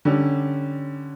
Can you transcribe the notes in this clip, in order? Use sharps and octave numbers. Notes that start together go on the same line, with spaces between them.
D3 G3 C#4